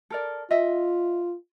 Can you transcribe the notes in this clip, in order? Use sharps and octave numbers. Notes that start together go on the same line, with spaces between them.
A4 A#4 D5
F4 D#5 E5